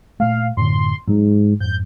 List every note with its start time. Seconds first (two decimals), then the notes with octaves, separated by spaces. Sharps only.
0.20 A#2 A3 F5
0.57 F#2 A2 D3 C6
1.08 G#2 F#3
1.61 F2 G#2 G6